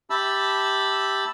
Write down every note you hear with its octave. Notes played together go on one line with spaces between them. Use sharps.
G4 E5 A5 B5 E6